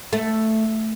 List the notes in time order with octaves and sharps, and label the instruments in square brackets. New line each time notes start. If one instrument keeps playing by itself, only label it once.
[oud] A3